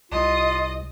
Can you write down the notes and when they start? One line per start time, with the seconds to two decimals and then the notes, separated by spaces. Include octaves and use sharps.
0.12 C2 F4 D#5